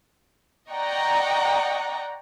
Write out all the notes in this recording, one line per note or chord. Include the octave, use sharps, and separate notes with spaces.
D5 D#5 F#5 G5 A#5 C#6